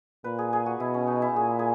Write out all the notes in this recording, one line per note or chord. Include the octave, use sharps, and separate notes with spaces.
A#2 B4
G#4
G#4
F#4
B2 E4
C#4
D#4
E4
A#2 G#4
G#4